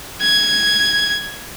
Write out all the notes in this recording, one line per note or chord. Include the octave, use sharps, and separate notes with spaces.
G#6